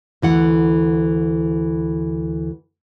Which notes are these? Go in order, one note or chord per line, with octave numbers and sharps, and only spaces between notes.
D2 E3 F#5